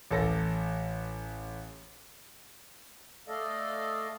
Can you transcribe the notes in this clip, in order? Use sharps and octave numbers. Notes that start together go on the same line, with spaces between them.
A1 A4 A#6
A3 A4 D5 D#5 F5